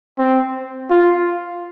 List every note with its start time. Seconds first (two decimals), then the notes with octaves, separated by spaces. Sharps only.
0.18 C4
0.90 F4